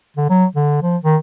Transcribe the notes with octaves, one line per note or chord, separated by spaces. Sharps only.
D3
F#3
D3
F3
D#3